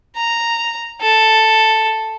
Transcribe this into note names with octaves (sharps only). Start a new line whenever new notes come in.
A#5
A4